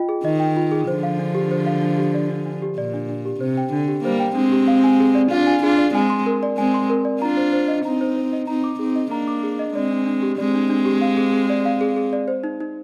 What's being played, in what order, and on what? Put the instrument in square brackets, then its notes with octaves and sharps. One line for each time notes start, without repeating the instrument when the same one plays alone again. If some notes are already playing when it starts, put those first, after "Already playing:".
Already playing: [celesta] F4 D#5 G5
G#4
[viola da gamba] D#3 [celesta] D#5
[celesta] G5
F4
G#4
[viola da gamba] D3 F3 [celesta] C5
[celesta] F5
D4
G4
C5
F5
D4
G4
D5
D4
D4
G4
[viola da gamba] A#2 [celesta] D5
[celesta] D4
D4
G4
[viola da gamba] C3 [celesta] C5
[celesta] G5
[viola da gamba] D3 [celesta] D4
[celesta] G4
[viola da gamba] G3 A#3 [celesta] C5
[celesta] G5
[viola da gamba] G#3 C4 [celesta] D4
[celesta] G4
F5
G#5
G#4
D5
[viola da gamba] D4 F4 [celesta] F5
[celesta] G#5
[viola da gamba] D4 F4 [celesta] G#4
[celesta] D5
[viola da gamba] G#3 C4 [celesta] G#5
[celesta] C6
A#4
D5
[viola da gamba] G#3 C4 [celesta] G#5
[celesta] C6
A#4
D5
[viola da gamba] D4 F4 [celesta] A#5
[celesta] C5
C5
D#5
[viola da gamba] C4 D#4 [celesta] A#5
[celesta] C5
C5
D#5
[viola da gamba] C4 D#4 [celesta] A#5
[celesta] D6
[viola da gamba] C4 D#4 [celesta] G#4
[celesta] D#5
[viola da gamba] A#3 D4 [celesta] A#5
[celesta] D6
G#4
D#5
[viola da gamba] G#3 C4 [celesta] D5
[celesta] D4
D4
G4
[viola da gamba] G#3 C4 [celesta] D5
[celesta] D4
D4
G4
F5
G#4
G#4
D5
F5
G#4
G#4
D5
C5
D#4
D#4